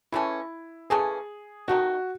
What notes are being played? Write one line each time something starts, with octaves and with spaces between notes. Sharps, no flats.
C#3 E3 A3 C#4 E4
C#3 E3 A3 C#4 G#4
D#3 F#3 A3 D#4 F#4